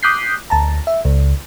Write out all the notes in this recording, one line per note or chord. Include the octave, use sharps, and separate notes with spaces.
D6 D#6 F#6 G6 B6 C7
D2 A5 A#5
E5
C#2